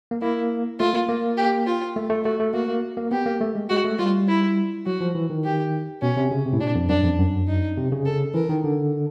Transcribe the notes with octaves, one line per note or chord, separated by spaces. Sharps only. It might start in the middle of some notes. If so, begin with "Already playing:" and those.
A#3
A#3 E4
A3 F4
A#3
A#3
G4
F4
A3
A3
A3 F#4
A3
A#3 F#4
A#3
A#3
B3 G4
A#3
A3
G#3
G#3 F#4
A3
G3 F4
E4
F#3 F#4
F3
E3
D#3
G4
B2 C#4
C3
C#3
C3
A2
A#2 D4
F2
F#2 D4
F2
F#2
D#4
C3
C#3
A4
E3 A#4
D#3
D3